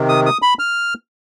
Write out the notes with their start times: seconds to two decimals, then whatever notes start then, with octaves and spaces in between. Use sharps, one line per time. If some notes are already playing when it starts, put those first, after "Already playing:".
Already playing: C3 D#3
0.09 D#6
0.26 D#6
0.42 B5
0.59 F6